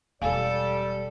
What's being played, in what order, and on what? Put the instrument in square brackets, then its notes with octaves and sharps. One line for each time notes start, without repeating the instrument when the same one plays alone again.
[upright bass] E1 [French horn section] G3 D5 [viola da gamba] A4 [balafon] F5 G#5